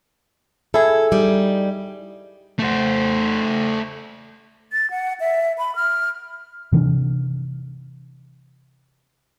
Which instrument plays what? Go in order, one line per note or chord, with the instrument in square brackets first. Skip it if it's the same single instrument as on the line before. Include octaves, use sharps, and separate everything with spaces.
[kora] E4 G#4 [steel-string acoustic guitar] A4
[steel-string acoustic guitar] G3 D#4
[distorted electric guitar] A3 C5
[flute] A6
F#5
E5
B5
F6
[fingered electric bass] C3 E3 C#4 D4